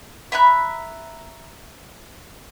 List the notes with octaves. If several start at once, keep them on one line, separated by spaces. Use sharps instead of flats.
E5 A#5 B5 F#6